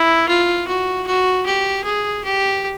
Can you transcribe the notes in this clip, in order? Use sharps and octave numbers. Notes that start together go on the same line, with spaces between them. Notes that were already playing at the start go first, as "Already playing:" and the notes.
Already playing: E4
F4
F#4
F#4
G4
G#4
G4